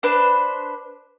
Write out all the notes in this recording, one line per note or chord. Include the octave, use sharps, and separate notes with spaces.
D4 B4 C5